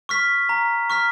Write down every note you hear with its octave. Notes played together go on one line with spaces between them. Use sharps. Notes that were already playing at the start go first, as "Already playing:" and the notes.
C#6 F6 B6
A#5
C#6 F6 B6